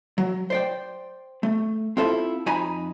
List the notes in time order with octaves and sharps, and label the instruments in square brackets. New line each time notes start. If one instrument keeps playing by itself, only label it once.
[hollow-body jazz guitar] F#3
C5 D5 G5
A3
C4 E4 F4 A4 E5
F2 D#4 G#5 A#5 B5